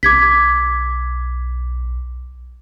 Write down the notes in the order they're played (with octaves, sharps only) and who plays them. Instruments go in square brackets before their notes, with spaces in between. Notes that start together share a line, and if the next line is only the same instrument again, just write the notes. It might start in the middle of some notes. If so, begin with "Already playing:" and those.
[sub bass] B1 [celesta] D6 G#6 B6